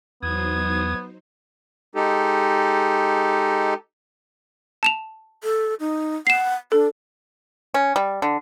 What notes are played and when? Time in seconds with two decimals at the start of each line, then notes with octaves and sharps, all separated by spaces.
0.23 E2 F#3 B3 D#4 C5 D#6 G#6
1.95 G#3 D#4 G4 A4
4.83 A5 E7 F7
5.43 A4
5.80 D#4
6.27 F#5 C7 E7
6.72 D4 A4
7.74 C#4
7.96 G3
8.22 D3